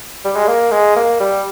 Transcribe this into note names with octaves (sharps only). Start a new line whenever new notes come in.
G3
G#3
A#3
G#3
A#3
G3